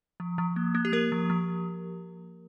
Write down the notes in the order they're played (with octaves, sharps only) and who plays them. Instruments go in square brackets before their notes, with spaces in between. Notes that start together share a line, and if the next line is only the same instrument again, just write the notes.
[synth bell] F3
F3
A#3
A#3
G4
A#3 A#4
F3
F3